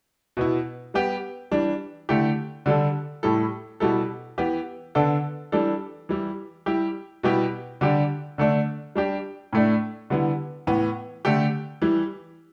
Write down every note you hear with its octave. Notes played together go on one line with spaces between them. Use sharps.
B2 B3 E4
G3 B3 G4
E3 G3 D4
D3 A3 E4 G4
D3 G3 D4 A4
A2 G3 E4 A4
B2 G3 E4 A4
E3 B3 G4
D3 B3 D4 A4
E3 G3 D4 A4
E3 G3 E4
G3 E4 G4
B2 G3 B3 E4 G4
D3 G3 D4 G4
D3 A3 D4
G3 D4 G4
A2 A3 D4
D3 G3 B3 E4
A2 E3 B3
D3 A3 G4
E3 G3 E4